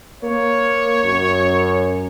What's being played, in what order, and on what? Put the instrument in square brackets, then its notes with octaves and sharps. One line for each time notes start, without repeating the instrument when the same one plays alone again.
[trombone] A#3 [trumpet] C#5
[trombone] F#2